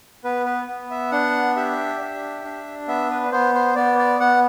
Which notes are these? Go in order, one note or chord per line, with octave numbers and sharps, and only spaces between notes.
B3 B4
B4
B3
E5
D4 F#5
G4 E5
D4
D4
B3 E5
B4
B3 C5
C5
B3 D5
D5
B3 F#5